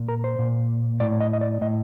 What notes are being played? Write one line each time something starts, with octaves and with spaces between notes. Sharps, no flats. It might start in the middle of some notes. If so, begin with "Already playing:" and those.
Already playing: A#2
A#4
C5
A#2
A2 D5
D#5
D#5
D5
A2 D#5